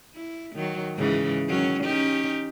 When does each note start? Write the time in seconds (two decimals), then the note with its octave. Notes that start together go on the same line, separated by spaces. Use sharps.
0.15 E4
0.55 D#3 F#3
0.96 G#2 C#3 E3
1.47 D#3 F#3 C#4
1.83 C#4 D#4 G4